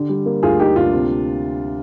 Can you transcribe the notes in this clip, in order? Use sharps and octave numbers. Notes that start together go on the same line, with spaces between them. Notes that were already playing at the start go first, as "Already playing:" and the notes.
Already playing: D3 G4
G3
A#3
D2 F4 G#4
A#3 D#4 G4
D2 D4 F4
C3